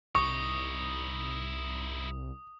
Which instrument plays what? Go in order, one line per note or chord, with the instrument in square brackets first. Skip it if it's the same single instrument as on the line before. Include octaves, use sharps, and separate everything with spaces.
[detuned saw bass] C2 [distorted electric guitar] D#4 E4 [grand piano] C#6 [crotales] D#6